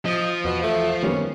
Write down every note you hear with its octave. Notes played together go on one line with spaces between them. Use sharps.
F3 D#5
E2 B2
A3
D#3 G3 A#3 B3 C#4